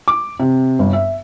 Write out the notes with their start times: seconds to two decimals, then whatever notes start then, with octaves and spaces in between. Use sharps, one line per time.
0.08 D6
0.40 C3
0.79 G1
0.93 E5